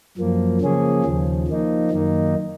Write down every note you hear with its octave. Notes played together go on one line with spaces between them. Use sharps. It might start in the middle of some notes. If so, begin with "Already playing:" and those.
F#2 F3 A#3
C#3 F3 A#3 C#4 G#4
D#2 C#3 F3
F3 A#3 D#4
F#2 D#3 A#3 D#4